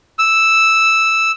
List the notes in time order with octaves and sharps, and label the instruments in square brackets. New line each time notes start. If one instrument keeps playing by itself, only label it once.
[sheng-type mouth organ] E6